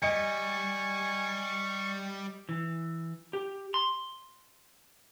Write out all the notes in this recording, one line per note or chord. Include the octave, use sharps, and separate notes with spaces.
G3 D#5 G#5 C#6 C#7
E3
G4
C6